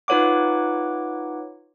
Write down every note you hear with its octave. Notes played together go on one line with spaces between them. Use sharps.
D#4 F4 B4 C#5 F#5 D6